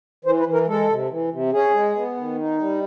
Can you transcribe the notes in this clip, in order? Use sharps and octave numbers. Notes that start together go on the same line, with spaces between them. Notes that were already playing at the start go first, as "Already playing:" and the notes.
E3 C5
B4
E3
A#4
G#3 A4
C3
E3
C3
C#4 G#4
G#3
B3
D#3
D#4
G3